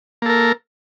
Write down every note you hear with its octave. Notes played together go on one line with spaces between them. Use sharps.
A#3 A4 A#4